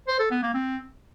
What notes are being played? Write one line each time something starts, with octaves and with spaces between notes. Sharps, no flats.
C5
A4
B3
A#3
C4